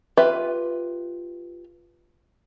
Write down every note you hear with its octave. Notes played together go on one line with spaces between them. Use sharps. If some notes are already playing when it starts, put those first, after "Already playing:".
F4 G4 B4 E5